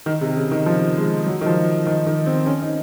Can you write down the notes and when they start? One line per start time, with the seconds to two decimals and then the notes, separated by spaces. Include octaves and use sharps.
0.06 D#3
0.21 C3
0.36 C#3
0.51 D#3
0.66 F3
0.96 G#3
1.26 F#3
1.41 D#3
1.46 F3
1.86 D#3
2.06 D#3
2.26 C4
2.46 C#4
2.62 D#4